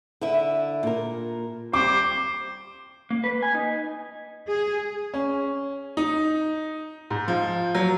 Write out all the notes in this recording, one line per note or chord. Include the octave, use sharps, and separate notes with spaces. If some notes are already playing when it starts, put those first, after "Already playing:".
D3 E4 E5
A#2 A#4
G3 C5 D6
A#3
B4
G#5
D#4
G#4
C#4
D#4
G#2
F3
F#3